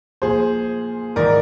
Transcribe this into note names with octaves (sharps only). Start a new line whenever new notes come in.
A#2 F3 G#4 C5
G#2 D#3 A#4 D5